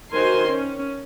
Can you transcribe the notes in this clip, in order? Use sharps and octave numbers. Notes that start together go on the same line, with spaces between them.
D#3 F#4 A#4 C5 G#5 C6
C#4